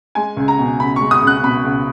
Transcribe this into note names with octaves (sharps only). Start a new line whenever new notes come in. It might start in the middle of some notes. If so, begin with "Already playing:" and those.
G#3 G#5
C#2
A#5
B2
C#2 B5
G#3 C#6
D#6
C#2 F#6
B2 B5
C#2